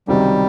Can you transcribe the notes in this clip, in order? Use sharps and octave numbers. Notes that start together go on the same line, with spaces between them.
C#2 C3 D#3 F#3 G3